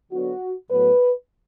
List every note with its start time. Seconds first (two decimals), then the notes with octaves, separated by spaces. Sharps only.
0.12 D3 F#3 B3 F#4
0.70 A2 F#3 B3 B4